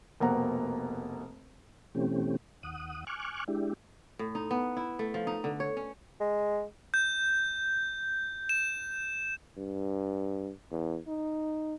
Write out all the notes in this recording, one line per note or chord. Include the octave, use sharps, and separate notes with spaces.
F1 B2 A#3 C4 F#5 A#5
B2 E3 A3 C4 C#4 G4
D#2 F#5 D#6
G#5 C#6 D6 F6 F#6
G#3 D4 E4 G4
A2
D#4
B3
E4
A3
F3
D#4
D3
C#5
C#4
G#3
G6
E7
G2
E2
D#4